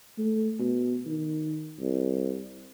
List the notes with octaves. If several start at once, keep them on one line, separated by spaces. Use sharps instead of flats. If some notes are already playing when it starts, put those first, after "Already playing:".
A3
B2
D#3
C2